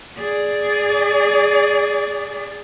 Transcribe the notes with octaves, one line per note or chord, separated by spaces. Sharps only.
G#4 D5